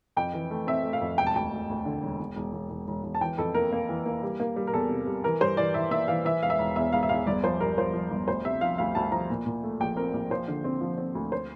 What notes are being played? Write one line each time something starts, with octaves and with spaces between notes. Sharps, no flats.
F2 G5
E3
A3
C4 E5
A3
F5
F2
E1 G5
A5
D2 G5
D2
D2
D3
E1
E1
E1
E1
E1
E1
E1
A5
E3 G5
F2 A4
A#3 A#4
A#3
E3
A#3
G3
A#3
G3
A#4
E2 A4
C3
G3
E3 A#4
G2 C5
E3 D5
E3 E5
A#3 E5
E3 F5
E3 E5
E1 F5
E5
E1
E2 E5
E1 F5
E5
E2 F5
G1 D5
F3 C5
G2 A#4
F3 C5
F3
G1
D2 C5
C3 E5
F3 F5
D2 F5
D2 A5
F3 A#5
A#2
A#2
A3
A#1 G5
C4 A#4
A#1
F3 C5
D3
C4
F3
C4
D2
C5